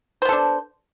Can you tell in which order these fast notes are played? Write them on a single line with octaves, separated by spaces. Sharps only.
C5 B3 A4 D4